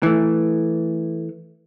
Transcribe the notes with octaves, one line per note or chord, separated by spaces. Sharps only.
E3 A3